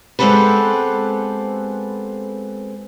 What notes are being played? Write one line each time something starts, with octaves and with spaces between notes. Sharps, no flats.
G#3 B3 C4 G4 A4 B4